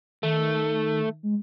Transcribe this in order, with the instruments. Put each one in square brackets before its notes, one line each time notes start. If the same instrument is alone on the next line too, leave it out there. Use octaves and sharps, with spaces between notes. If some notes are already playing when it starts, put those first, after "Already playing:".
[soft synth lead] D#3 [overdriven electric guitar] A3
[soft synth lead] G#3